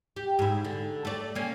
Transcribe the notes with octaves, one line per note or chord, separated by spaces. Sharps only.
G4
G#2 E4
D3
A3 D5
A#3 C#4